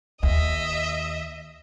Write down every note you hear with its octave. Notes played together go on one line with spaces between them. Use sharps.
D#2 D#5 E5